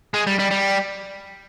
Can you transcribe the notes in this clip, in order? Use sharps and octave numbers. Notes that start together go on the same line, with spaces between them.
G#3
G3
G3
G3